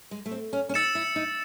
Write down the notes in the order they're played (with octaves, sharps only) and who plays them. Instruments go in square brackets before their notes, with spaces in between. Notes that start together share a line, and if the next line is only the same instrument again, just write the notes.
[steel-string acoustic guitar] G#3
A3
C4
C#4
C#4
[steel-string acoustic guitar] D#4 [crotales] E6 A6 C#7 E7
[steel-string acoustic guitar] E4
D#4